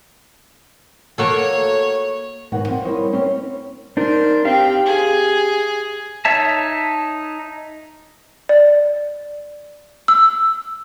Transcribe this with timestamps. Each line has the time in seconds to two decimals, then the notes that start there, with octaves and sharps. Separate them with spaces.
1.18 A#3 F#4 A4 C#5
2.52 D#2 G#2 B2 A#3 F#5
2.68 F3 C4
2.85 G3 E4 A#4 C5 C#5 D#5
3.12 G3 C4 C#4 E4 C5
3.97 D4 D#4 A#4 C5
4.45 C4 G4 F5 G5
4.86 G#4
6.25 D#4 C#5 E5 A5
8.49 D5
10.08 E6